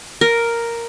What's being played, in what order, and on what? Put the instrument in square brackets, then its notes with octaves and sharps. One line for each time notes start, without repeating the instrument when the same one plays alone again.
[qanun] A#4